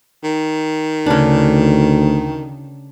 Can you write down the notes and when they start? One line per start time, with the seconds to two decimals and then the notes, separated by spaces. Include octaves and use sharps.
0.23 D#3
1.06 D2 C#3 D4